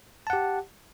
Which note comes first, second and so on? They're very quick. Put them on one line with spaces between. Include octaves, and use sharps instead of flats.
A5 F#5 G4